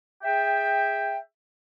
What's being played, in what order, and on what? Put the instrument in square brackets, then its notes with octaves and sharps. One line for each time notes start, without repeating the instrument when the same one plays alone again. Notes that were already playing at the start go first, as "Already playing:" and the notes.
[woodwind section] G#4 E5 G5